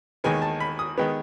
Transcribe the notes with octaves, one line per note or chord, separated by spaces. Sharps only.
D#2 D#3 G#3 B3 G#5
A5
B5
D#6
D#3 G#3 B3